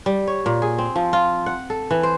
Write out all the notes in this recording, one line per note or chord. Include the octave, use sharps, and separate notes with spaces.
G3
C#5
A#2
G#4
C4
F3
F4
F#5
A4
E3
C5